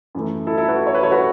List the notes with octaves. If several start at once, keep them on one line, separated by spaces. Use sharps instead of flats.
F#2 E3 A3
E4 A4
E4 A4
F#4 B4
C#5
B4
A4 C#5
F#4 B4